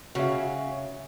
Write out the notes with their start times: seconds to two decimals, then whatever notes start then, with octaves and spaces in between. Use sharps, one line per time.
0.15 C#3 F#4 G#4 E5